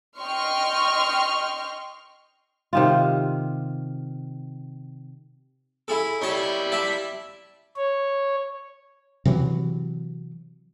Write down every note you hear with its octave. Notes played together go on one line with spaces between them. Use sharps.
D#5 G5 C6 C#6 F6
C3 D#3 F4
E4 G#4 A4
G3 E4 C#5 D#5 A5
D5 E5 A5
C#5
C3 E3 F#3